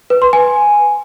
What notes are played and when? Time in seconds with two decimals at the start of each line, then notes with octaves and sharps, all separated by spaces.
0.10 B4
0.22 C6
0.33 G#5